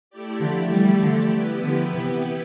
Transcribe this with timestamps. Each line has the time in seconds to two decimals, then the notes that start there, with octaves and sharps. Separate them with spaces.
0.10 A3 E4 G4 D5
0.40 D3 F3
0.72 E3 G3
1.02 D3 F3
1.32 E3 G3 B3 E4 G4 B4
1.62 D3 F3
1.93 C3 E3